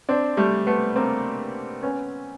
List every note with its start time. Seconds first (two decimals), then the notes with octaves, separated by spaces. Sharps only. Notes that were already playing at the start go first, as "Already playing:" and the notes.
0.09 C4 D4
0.37 G3 A3
0.67 A3 B3
0.96 A#3 C4
1.83 B3 C#4